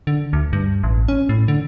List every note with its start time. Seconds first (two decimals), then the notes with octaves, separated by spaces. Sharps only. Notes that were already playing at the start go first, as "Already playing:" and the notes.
0.07 D3
0.33 D2
0.53 G2
0.83 A1
1.08 C#4
1.29 A2
1.48 D3